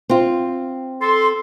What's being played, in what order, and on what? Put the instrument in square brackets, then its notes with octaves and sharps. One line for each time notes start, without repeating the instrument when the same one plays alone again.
[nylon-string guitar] C4 F4
[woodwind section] A4 C6